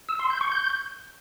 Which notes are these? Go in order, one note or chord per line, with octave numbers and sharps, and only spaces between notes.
E6
C6
G6
C#6
G6